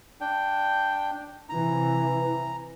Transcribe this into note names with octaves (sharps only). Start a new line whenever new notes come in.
D4 G5
C3 E3 A#5